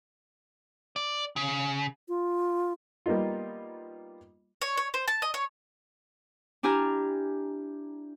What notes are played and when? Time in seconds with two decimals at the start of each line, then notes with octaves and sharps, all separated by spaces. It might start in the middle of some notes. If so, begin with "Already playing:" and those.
0.96 D5
1.36 C#3
2.08 F4
3.06 G3 A#3 B3 D#4 F4
4.62 C#5
4.77 C#5
4.94 C5
5.08 A5
5.22 D#5
5.34 C#5
6.63 D4 E4 G4 G#5 A#5 F6